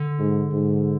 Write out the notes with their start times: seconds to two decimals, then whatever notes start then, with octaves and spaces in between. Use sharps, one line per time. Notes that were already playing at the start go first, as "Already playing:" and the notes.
Already playing: D3
0.19 G#2
0.51 G#2